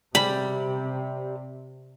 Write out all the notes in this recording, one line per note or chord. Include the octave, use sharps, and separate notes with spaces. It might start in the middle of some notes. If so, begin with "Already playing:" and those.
C3 G3 B5